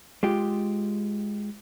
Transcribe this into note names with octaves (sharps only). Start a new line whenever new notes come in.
G#3 F4 G4